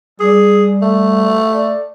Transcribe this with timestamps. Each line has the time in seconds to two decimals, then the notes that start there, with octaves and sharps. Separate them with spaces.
0.20 G3 G#4
0.82 A3
1.51 D5